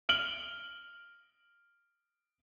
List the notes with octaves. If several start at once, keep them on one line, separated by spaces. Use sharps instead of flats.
F6 D7 F#7 G7